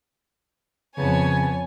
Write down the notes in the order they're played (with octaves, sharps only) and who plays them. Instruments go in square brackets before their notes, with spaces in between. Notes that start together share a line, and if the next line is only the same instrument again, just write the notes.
[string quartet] F2 B3 A5 [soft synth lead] C#3 [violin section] C#5 G#5